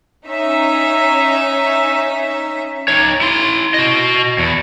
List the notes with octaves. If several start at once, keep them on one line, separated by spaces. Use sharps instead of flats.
C#4 D#4 E5
D#4 C#5
E4 C6
F#4 D#5
E2